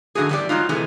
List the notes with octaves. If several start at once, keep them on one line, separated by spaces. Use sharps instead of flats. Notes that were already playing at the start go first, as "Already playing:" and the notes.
F#2 D3 E3 A#3 F#4 G#4
E2 A2 G3 B3 G4 D5
F#3 G#3 D#4 F4
C3 E3 G#3 A3